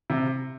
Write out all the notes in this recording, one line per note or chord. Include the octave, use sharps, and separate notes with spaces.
C3